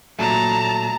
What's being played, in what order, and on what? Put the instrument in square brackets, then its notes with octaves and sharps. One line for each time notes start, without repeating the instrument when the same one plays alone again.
[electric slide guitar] A#2 F#3 A3 [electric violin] A5 A#5